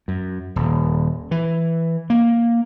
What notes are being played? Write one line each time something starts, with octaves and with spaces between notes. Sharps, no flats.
F#2
D#1
E3
A#3